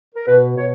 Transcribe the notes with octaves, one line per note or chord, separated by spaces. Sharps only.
A#4
B2 B4
B2 C#5